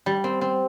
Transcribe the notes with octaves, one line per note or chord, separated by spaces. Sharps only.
G3
C4
C4